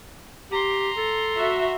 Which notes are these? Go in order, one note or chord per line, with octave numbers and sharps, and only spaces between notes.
G4 A#5 C6
A4
F#4 E5